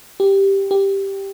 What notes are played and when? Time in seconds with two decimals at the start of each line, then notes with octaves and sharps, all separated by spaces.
0.20 G4
0.71 G4